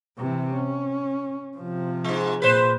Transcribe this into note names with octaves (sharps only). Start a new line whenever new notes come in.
C3 E3
C#4
C3 F3
G#2 G#3
A#2 B4 C5